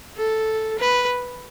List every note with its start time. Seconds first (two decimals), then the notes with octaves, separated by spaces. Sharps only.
0.16 A4
0.79 B4